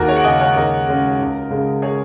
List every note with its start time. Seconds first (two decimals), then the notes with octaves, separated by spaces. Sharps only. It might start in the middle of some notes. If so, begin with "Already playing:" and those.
Already playing: D#2 F#4 A#4
0.08 G#4 C#5
0.16 F#5
0.24 C#3 G#3 C#4 D#5 G#5
0.40 C#5 F#5
0.56 D#2 A#4 D#5
0.87 C#3 G#3 C#4
1.19 C#2
1.51 C#3 G#3
1.82 G#4 C#5